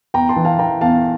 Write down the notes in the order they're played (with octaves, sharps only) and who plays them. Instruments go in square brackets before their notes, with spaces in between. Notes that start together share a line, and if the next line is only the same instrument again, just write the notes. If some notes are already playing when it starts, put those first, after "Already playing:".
[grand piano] E2 G5 A#5
A5 C6
E3
F5 A5
E3 G5 A#5
E2 F5 A5